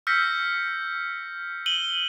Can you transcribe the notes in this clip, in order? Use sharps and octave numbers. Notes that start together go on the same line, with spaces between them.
E6 F6 G6 A#6 B6 C#7
D#7 F#7 G7